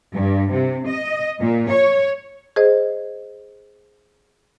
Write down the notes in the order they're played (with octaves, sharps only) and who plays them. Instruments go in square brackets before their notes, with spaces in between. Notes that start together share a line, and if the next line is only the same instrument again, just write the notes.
[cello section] G2
C3
D#5
A#2
C#5
[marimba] G#4 C5 D#5